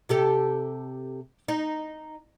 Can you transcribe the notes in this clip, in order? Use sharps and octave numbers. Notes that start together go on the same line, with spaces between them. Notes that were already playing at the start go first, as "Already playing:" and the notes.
C3 G4 A4
D#4